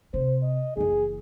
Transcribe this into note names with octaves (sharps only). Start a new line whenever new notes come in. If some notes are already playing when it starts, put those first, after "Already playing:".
C3 C5
D#5
F#1 E3 G#4